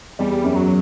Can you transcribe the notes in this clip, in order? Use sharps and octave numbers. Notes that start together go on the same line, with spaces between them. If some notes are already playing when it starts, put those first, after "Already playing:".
E2 G3
F#2
F#3